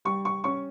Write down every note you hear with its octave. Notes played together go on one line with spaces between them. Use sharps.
G3 C#6
C#6
C#4 C#6